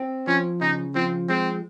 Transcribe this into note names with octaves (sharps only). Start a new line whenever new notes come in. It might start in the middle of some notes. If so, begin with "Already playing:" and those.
Already playing: C4
F3 C#4
C#3 D#4
F3 C4
G#3 C4